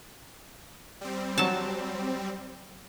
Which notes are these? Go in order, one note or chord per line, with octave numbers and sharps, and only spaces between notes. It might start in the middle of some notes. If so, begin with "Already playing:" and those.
G3 C4
F#3 A5